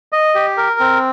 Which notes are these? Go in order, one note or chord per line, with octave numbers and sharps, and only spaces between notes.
D#5
G4
A#4
C4